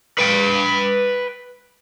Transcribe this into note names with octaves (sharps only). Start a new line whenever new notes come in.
B4 G5